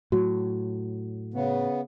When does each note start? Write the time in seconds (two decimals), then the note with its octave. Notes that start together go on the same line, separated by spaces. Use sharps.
0.12 A2 F#3 F#4
1.34 C#3 B3